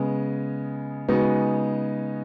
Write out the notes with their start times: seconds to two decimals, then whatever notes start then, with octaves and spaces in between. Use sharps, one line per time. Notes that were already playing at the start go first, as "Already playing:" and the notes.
Already playing: C#3 G#3 B3
1.08 C#3 G#3 B3 D#4 F#4